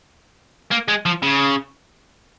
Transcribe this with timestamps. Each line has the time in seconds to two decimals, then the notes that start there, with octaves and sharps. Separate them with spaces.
0.71 A#3
0.88 G#3
1.06 F3
1.23 C#3